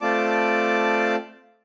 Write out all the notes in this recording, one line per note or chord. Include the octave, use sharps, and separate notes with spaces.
A3 C4 F4 D5 A5 D6